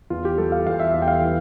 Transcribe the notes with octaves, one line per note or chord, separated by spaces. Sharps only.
E2 F4
G4
G3 A4
F5
E2 F5
E5
E2 E5
G5
F5
E3